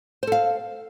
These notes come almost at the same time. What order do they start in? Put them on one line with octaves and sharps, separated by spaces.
C5 A4 F5